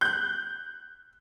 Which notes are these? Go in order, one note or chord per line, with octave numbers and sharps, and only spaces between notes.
F#6 G6